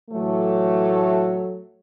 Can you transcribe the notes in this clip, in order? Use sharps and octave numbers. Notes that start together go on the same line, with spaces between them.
A2 E3 F#3 A3